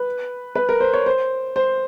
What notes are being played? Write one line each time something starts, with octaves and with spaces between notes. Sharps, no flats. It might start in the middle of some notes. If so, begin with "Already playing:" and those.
Already playing: B4
B4
A#4
C5
C#5
C5
C5